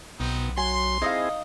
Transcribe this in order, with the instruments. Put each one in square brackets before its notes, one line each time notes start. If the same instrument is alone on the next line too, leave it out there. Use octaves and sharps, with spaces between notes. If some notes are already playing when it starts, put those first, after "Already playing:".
[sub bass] B1 [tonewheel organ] B2 [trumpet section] B3 C4 D#4
[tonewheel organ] F#3 [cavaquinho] G#5 [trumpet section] C6
[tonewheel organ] C4 E4 G#4 [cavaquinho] D#4 D#5 F5